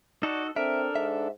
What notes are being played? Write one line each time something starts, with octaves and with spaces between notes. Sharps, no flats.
D#4 F#4 A4 D5
C4 D4 A4 A#4 E5
G#2 E5